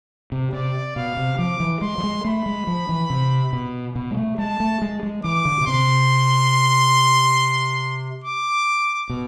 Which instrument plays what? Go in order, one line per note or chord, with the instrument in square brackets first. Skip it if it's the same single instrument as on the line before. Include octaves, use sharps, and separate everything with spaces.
[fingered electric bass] C3
[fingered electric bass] C3 [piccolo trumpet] D5
[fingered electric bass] B2 [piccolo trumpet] F5
[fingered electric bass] C3
[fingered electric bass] F3 [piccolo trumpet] D6
[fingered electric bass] E3
[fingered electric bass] G#3 [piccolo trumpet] C6
[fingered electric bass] F3
G#3
[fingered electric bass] A3 [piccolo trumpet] B5
[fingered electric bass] G#3
F3
E3
C3
B2
B2
G#3
A3
[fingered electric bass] G#3 [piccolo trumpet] A5
[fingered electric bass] A3
G#3
G#3
[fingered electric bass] E3 [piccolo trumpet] D6
[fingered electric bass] D3
B2
[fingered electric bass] C3 [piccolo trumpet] C6
[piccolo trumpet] D6
[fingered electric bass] B2